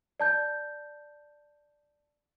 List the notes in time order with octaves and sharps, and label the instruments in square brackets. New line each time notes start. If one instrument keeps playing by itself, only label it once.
[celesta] D5 A5 G6